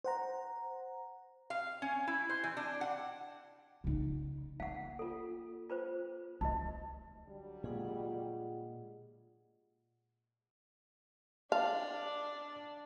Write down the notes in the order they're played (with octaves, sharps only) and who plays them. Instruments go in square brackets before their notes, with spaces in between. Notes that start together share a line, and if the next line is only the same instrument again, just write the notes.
[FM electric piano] C5 F#5 A#5
[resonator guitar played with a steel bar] F5
C#4
E4
C5
E3
D4
F#5
[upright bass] C#3 D#4
[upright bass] A#3 [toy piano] F5 F#5
[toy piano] F4 A4
F4 B4 C5
[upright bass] D2 [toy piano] D#4 F#4 D#5
[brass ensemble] D3 F#3 G3
[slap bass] A#2 G#3 [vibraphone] F4 G#4 F#5
[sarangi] D4 [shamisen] F5 [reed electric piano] A5